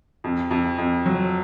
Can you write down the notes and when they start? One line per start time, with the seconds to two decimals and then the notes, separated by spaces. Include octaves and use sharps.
0.24 F2
0.51 F2
0.78 F2
1.06 F#3